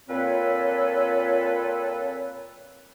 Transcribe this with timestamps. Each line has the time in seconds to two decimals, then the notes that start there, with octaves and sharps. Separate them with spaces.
0.09 A#2 C4 F4 A4 B4 C#5